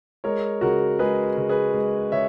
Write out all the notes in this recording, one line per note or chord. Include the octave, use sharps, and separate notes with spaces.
G#3 A#4 C#5
C#3 F#4 A#4
G#3 G#4 B4
C#3
G#4 B4
G#3
C#3 C#5 E5